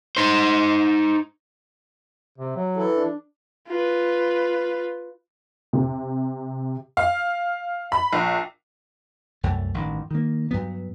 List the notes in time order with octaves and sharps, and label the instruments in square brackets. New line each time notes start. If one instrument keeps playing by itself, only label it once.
[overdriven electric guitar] D#4 C5
[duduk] C3
F#3
[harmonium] E3 E4 A4
[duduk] D4
[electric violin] F4 B4
[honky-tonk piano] C3
F5
B5
A#1
[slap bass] C2 F#2 A3
A1 G2 D#3
D#3 A#3
G2 F#3 B3